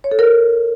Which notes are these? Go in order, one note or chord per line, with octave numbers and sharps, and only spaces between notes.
C#5
A4
A#4